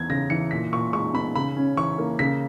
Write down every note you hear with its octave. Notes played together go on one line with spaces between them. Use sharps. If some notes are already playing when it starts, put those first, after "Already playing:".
Already playing: E2 B3 G#6
C#3 A#6
E3 C#7
A#2 B6
A#2 C#6
G#3 C#6
B3 B5
C#3 B5
C#4
E3 C#6
A#3
C#3 B6